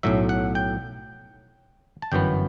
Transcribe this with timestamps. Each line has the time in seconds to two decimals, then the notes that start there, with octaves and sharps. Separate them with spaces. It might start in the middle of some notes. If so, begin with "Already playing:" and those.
0.03 B1 A2 F#3 E5
0.29 F#5
0.55 G5
2.02 A5
2.12 G1 F#2 E3 B3 G5